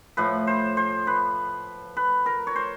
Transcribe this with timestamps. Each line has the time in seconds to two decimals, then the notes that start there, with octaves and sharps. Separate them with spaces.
0.17 A2 F3 B4
0.47 C5
0.77 C5
1.07 B4
1.97 B4
2.26 A#4
2.47 C#5
2.56 C5